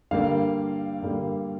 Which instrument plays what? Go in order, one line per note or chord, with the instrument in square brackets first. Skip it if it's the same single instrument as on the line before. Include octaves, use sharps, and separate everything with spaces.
[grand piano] G2 D3 G3 A#3 F5
G2 D3 G3 A#3